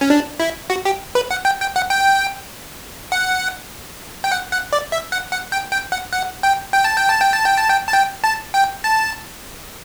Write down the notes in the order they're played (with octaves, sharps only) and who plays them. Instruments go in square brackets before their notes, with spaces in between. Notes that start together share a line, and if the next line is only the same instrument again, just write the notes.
[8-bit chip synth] C#4
D4
E4
F#4
G4
B4
F#5
G5
G5
F#5
G5
F#5
G5
F#5
F#5
D5
E5
F#5
F#5
G5
G5
F#5
F#5
G5
G5
A5
G5
A5
G5
A5
G5
A5
G5
A5
G5
A5
G5
A5